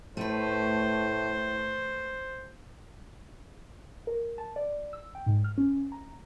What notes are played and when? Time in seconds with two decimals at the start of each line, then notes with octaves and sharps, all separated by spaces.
0.17 A2 A3 B4 C5
4.07 A#4
4.38 A5
4.56 D5
4.93 E6
5.15 G5
5.26 G#2
5.44 F6
5.58 C#4
5.92 A#5